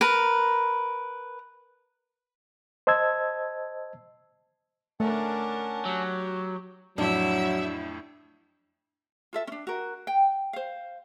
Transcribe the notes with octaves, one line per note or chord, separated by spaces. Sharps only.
A#4 B4
C5 D#5 A5 E6 G#6
A3 C#4 D4 A#4 F#5 A5
F#3 G4
F2 A2 F#3 D4 E4 E5
F4 A4 E5
C#4 D4
F#4 A#4
G5
C5 F5